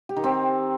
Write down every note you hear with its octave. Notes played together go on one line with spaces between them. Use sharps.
G4
D#3
C4